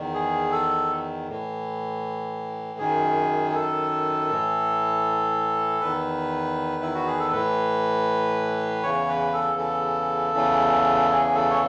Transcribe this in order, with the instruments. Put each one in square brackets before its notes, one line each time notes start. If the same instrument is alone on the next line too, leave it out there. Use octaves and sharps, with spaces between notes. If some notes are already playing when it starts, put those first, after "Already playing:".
Already playing: [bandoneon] E2 D#3
G#4
A4
A2 E3
F#2 D#3 G#4
G#4
A4
A2 E3
E2 D#3 B4
E4
F#4
G#4
A4
A2 E3 B4
E2 C#3 E3 C#5
B4
A4
A4
E2 C#3 E3
G#4
A4
C#5